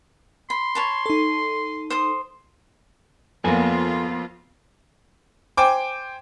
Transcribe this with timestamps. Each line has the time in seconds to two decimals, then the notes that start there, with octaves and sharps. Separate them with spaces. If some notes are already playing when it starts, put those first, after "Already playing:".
0.50 B5 C6
0.75 C#5 A5 B5
1.06 D#4 A4
1.90 C5 C6 D#6
3.44 F2 F3 A#3 B3 F4 A4 G#5
5.57 C5 G5 G#5 D6